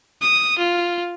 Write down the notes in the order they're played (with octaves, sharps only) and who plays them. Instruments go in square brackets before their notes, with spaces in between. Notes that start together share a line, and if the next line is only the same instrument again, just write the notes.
[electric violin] D#6
F4